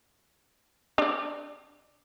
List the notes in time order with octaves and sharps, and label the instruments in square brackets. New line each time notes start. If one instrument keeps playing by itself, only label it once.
[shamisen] D4 D5